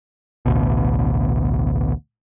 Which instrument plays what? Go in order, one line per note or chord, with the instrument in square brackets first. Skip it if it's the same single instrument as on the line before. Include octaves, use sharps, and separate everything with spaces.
[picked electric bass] A1 D2 B2